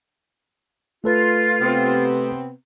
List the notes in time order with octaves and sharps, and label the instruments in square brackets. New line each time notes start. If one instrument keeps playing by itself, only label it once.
[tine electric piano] A3 A4 B4 [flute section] F4
[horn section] C3 B3 C4